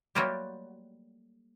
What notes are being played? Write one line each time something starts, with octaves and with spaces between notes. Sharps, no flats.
F#3 G3 A3 A#3 F4 G4